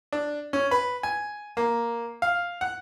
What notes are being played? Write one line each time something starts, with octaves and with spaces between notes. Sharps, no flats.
D4
C#4
B4
G#5
A#3
F5
F#5